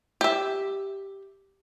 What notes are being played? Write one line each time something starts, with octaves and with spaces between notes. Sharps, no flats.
G4 E5